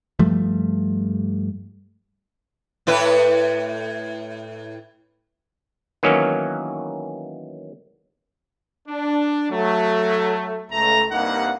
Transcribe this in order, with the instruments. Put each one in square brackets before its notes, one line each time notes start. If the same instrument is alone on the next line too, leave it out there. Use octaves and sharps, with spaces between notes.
[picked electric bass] G2 F3 G3 A3
[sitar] A2 E4 B4
[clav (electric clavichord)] D#3 E3 F#3 A#3 B3 C#4
[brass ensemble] D4
F#3 A3
C#2 A3 A#5
C2 G2 A#3 D#4 F5 F#5